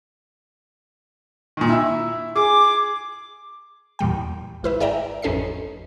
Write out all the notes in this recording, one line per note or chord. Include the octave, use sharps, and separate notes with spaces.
A#2 D#3
E4 E5
G#4 D6
E2 A#2 G3 G5
G#1 E4 B4 E5
G#4 D5 E5 G5 A#5
A1 F2 C#4 A4 D#5 C7